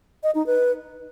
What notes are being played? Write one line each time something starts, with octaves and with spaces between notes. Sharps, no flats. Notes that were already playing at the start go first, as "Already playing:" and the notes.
D#5
D#4
B4